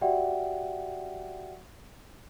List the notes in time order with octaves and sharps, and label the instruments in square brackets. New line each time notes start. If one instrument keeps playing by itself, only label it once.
[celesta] F#4 G4 D5 E5 F#5 G5